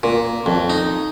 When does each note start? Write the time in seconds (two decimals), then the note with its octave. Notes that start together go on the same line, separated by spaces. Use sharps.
0.03 A#2
0.46 F2
0.70 D#4